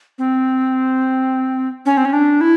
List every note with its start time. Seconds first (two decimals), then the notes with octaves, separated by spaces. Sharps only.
0.18 C4
1.86 C#4
1.97 C4
2.05 C#4
2.13 D4
2.41 E4